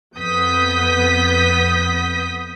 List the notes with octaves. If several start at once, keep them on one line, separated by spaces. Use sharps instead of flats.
F2 B3 D#6 G6 B6